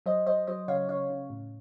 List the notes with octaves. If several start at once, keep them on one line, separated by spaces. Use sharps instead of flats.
F#3 C5 D#5
F#3 C5 D#5
F#3 C5 D#5
C#3 C#5 F5
C#3 C#5 F5
C#3
A2